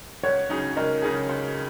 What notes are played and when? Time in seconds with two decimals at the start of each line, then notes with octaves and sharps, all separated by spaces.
0.23 C#2 C#5 F#5
0.50 C#3 F#3 D#4 G#4
0.77 C#2 A#4 D#5
1.02 C#3 F#3 D#4 G#4
1.29 C#2